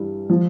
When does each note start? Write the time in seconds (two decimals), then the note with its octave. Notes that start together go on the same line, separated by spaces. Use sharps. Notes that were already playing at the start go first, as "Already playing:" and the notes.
Already playing: G2 E3 G3
0.29 F3